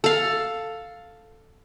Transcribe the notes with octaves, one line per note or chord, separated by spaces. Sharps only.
A4 F5